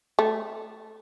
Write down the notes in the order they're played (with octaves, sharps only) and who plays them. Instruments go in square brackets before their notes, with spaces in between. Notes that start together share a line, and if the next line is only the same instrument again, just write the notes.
[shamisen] A3